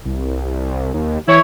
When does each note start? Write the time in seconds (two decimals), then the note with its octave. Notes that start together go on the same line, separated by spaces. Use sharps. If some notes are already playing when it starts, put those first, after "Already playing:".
0.05 C2
0.94 D#2
1.28 E3 E4 C#5